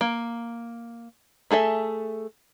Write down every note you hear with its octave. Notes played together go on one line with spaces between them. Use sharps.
A#3
A3 G#4 A4 E5